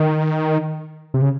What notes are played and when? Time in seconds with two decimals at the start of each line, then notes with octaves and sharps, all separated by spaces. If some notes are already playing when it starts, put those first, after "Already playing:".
Already playing: D#3
1.14 C3
1.22 C#3